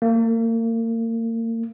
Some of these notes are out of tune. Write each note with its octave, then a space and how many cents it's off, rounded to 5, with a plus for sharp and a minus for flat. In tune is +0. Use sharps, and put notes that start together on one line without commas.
A#3 -35